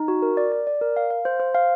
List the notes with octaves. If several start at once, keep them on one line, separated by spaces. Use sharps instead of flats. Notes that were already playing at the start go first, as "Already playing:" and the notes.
Already playing: D#4
F#4
A#4
D5
D5
D5
A#4
F5
F5
C5
C5
F5